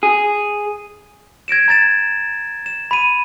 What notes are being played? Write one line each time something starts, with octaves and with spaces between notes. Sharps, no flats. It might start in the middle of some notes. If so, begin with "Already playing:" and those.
G#4
G#6 A#6 D7 E7
A#5 G#6 A6 E7
E7
B5 D#7